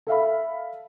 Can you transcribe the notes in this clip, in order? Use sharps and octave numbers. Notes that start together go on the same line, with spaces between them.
A4 E5 F5 B5